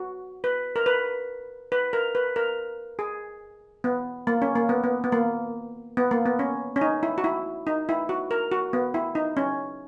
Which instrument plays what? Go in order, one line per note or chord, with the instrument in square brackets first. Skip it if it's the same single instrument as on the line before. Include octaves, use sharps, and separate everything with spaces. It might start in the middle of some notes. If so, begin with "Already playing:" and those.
Already playing: [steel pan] F#4
B4
A#4
B4
B4
A#4
B4
A#4
G#4
B3
A#3
C#4
A#3
B3
B3
B3
A#3
B3
A#3
B3
C#4
C#4
D#4
E4
F#4
E4
D#4
E4
F#4
A#4
F#4
B3
E4
D#4
C#4